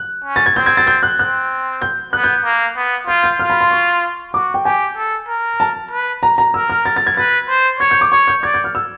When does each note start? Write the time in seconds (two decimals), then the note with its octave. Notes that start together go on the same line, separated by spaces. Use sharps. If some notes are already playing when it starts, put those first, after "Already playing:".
Already playing: F#6
0.24 C#4
0.36 A6
0.46 G#6
0.56 C4 G6
0.66 G#6
0.77 A6
0.87 G6
1.03 F#6
1.19 C4 F#6
1.81 G6
2.13 B3 F#6
2.24 G6
2.45 A#3
2.76 B3
3.08 F4 G6
3.23 G6
3.39 F4 F6
3.50 B5
3.61 C6
3.71 C#6
4.34 F#4 D6
4.54 G5
4.65 G4 G#5
4.97 A4
5.29 A#4
5.60 A5
5.92 B4
6.23 A#5
6.38 A#5
6.54 A#4 E6
6.70 F6
6.86 A6
6.96 A6
7.07 G#6
7.17 B4 A6
7.49 C5
7.80 C#5 G#6
7.91 G6
8.01 D6
8.12 C#5 C#6
8.28 G6
8.43 D5 G#6
8.54 G6
8.64 F6
8.75 E6